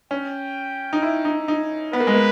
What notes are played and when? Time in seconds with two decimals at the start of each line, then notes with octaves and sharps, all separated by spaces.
0.11 C#4 G5
0.93 D#4
1.02 E4
1.25 D#4
1.48 D#4
1.93 B3 B4
2.00 A#3
2.07 G#3
2.14 A#3